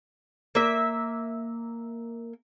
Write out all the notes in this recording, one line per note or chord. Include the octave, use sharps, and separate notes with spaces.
A#3 E5